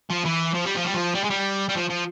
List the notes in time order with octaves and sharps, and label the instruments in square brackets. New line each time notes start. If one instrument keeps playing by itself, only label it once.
[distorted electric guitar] F3
E3
F3
G3
F3
G3
F3
G3
G#3
G3
G3
F3
F3